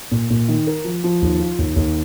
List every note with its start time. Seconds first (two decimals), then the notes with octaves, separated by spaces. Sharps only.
0.11 A#2
0.30 A#2
0.48 D#3
0.67 A#4
0.84 F3
1.04 F3
1.22 D#2
1.39 F4
1.58 D#2
1.76 D#2